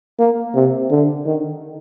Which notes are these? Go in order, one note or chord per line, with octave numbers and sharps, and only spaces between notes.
A#3
C3
D3
D#3